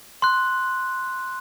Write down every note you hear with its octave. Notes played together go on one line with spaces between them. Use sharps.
C6 F#6